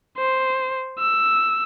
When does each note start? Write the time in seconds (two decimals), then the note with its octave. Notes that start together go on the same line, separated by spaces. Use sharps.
0.17 C5
0.99 E6